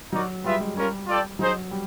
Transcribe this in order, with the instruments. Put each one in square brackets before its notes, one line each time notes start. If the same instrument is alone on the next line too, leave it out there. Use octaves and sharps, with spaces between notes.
[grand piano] F#3 [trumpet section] D#4 F#4 A#4 D5
[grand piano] G3 [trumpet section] F4 G#4 B4 E5
[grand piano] G#3
[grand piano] G3 [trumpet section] C#4 F4 A#4
[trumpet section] F4 A4 D5 G5
[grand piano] F#3 [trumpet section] D#4 G#4 C5 D#5
[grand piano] G3